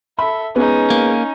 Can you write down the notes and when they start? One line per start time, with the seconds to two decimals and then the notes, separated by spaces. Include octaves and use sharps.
0.19 A4 E5 B5
0.56 G#3 B3 C#4 D#4
0.90 A#3